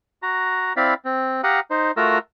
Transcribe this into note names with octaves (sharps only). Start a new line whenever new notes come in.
F#4 A#5
C4 E4 D5 F5 B5
C4
G4 F5 F#5 A#5 D#6 F#6
D#4 C5
A3 F4 F#4 A#4 A#5 E6